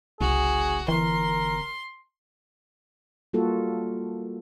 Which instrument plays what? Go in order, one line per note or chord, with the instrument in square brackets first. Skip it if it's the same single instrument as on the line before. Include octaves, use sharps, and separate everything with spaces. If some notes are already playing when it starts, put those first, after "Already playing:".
[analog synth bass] F#1 [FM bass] C2 [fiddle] F#4 [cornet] G#4
[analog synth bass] G1 [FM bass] E3 [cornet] A#4 [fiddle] C6
[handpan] G3 A#3 F4 F#4 A4